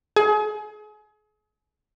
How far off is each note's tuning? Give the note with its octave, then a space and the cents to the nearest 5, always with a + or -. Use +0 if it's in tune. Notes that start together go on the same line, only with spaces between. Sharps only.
G#4 +35 G#5 +35